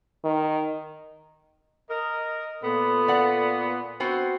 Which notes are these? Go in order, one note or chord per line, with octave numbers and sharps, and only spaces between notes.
D#3
A#4 D#5
A#2 B3 A4
D5 F#5
B3 C4 F#4